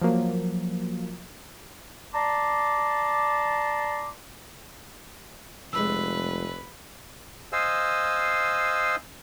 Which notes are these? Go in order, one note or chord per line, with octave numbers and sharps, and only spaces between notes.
F3 F#3 A#3
D5 A5 A#5 C6 D6
F1 F3 G#3 B4 E6
C5 D#5 F5 G#5 E6